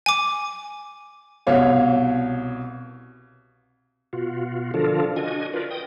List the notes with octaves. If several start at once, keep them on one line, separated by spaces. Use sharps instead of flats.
G#5 D6
C2 B2 C#5 F5
B2 F4 F#4
D3 F3 D4 F4 A4 A#4
D4 F#4 D#5 G#5
F4 A#4 B4 D5
G5 D#6